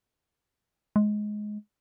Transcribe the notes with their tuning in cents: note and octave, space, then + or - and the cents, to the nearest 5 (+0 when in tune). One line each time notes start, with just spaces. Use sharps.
G#3 +15